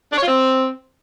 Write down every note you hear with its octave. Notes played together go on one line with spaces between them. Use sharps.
D4
C#5
F4
C4